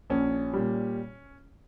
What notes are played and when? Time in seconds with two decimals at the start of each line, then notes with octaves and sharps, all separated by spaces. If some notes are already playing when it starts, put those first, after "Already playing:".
0.10 A#1 C#4
0.53 A#2 G3